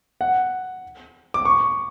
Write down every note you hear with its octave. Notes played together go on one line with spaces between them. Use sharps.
F#5
D6
C#6